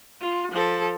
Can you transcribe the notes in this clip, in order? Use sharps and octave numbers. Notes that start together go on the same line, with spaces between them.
F4
F3 A4